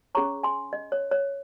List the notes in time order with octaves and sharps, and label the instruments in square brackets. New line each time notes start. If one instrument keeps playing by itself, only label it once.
[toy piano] C#4 G#4 C#5 A#5 C#6
G#5 C6
D#5
C#5
C#5